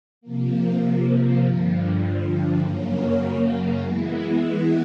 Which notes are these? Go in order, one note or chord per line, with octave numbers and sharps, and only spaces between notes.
C3 F3 A#3
G2 D3 F3
F#2 C#3 F#3 A#3 C#4
E3 G#3 B3 E4